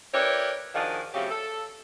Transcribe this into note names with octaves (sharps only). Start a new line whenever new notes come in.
E4 G4 A#4 B4 C#5 D5
D#3 F3 D4 F#4 G#4
C#3 F3 F#3 A3 C4 G4
A4